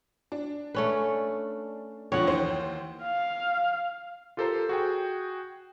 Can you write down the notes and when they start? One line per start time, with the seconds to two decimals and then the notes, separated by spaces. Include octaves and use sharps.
0.32 D4
0.75 A3 C#4 B4
2.12 F2 D3 F3 C#5 F#5
2.27 D#2 E3 C5
3.03 F5
4.37 F4 G4 A4 A#4 C5 A#5
4.69 F#4 G#4 G5